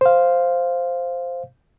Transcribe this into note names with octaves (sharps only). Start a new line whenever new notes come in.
C5 F5